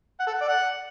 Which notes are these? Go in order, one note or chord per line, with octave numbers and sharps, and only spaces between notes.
F#5
A4
F#5
D5
F#5